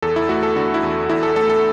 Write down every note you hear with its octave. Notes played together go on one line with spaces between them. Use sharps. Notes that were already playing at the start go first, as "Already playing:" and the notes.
E2 A4
E4
A3 F#4
A4
D3 F#4
E4
E2
E2 E4
A4
A3 A4
A4